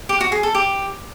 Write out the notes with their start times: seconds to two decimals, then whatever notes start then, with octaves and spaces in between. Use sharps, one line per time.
0.09 G4
0.21 F#4
0.32 G#4
0.43 A4
0.55 G4